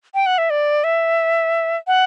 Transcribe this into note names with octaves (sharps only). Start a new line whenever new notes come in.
G5
F#5
E5
D5
E5
F#5